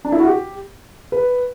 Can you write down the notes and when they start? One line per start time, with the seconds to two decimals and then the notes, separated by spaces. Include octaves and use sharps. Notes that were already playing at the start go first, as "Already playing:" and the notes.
0.05 D4
0.12 E4
0.20 F#4
0.27 G4
1.12 B4